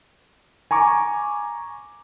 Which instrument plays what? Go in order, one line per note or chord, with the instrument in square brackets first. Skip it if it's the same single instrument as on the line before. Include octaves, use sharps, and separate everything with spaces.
[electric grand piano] G#5 A#5 C#6 D6